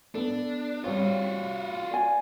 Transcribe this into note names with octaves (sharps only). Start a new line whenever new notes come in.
B3 D4 A4
G3 C4 F4 F#4 C#5
D5 G#5